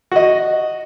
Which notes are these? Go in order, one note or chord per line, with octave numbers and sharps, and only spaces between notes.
F#4 D#5